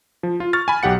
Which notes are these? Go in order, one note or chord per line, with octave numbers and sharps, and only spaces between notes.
F3
F4
C#6 F6 A6
G#5 B5
B1 G4 F#5 C#7